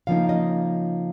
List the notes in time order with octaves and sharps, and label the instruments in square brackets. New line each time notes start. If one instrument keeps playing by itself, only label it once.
[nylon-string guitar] C#3 F3 A#3 D#4 F5
D#5